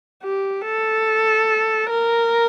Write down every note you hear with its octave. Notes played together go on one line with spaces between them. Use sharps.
G4
A4
A#4